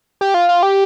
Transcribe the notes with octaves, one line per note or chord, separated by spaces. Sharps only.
G4
F4
F4
G4